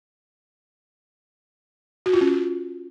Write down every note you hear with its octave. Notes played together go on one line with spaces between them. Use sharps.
F#4
F4
C#4